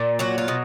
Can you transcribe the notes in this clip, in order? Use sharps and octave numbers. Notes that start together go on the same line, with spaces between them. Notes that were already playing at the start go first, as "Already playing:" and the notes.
Already playing: A#2
F#3 F#4
F4
B2